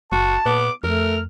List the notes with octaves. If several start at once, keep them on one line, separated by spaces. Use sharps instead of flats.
F#1 F#4 A5
A#2 B3 D6
F2 A3 A#4 F6